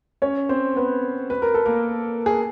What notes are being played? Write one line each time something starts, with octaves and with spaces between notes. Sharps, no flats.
C#4 C#5
C4 C5
B3 B4
B4
A#4
A4
A#3 A#4
G#4